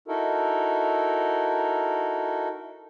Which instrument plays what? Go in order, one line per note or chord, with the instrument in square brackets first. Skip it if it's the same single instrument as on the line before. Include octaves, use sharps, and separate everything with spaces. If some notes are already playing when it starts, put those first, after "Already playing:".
[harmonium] D#4 E4 F#4 A4 A#4